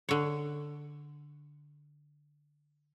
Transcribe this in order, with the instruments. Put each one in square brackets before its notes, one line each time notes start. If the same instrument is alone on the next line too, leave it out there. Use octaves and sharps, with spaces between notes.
[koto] D3 C#5